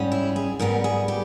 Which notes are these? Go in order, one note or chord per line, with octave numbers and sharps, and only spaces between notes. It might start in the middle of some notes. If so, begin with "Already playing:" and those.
Already playing: G#2 G3 C#4
E4
G#4
G#2 G3 B3 A#4
G#4
G4